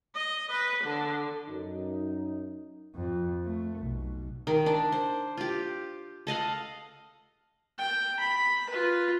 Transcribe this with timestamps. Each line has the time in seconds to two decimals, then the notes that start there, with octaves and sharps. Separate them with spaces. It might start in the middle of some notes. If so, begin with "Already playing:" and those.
0.15 D#5
0.51 B4
0.83 D3
1.47 F#2 D#4
2.95 F2
3.45 A3
3.80 B1
4.47 D#3
4.66 D4
4.92 C5
5.37 F4 G4
6.27 A4 D#5 F5 F#5
7.78 G5
8.20 B5
8.70 F4 B4